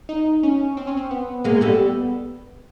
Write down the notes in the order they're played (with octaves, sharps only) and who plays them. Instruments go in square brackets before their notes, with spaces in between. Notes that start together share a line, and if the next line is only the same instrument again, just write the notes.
[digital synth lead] D#4
C#4
C4
C#4
C4
B3
[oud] G#3 A#3
G3 A3